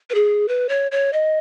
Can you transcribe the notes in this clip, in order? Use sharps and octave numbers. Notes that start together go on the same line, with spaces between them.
B4
G#4
B4
C#5
C#5
D#5